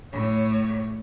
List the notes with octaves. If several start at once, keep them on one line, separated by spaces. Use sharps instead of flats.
A2 C#5